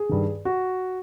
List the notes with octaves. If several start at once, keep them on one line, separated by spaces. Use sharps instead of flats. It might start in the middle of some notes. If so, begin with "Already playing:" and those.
Already playing: G#4
G2 D#3
F#4